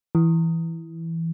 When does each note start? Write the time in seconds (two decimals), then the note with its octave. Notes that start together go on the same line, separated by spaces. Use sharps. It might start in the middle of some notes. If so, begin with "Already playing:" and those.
0.15 E3